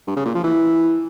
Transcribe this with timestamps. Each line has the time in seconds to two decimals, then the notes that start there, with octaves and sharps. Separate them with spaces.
0.07 G2
0.16 C#3
0.25 A#2
0.35 F3
0.44 E3